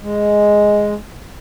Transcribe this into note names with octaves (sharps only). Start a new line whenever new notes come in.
G#3